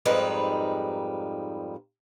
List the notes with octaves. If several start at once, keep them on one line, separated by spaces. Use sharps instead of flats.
F2 G#2 G3 D#4 B4